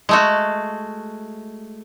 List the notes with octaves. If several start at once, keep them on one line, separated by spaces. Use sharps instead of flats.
G#3 A3 F#4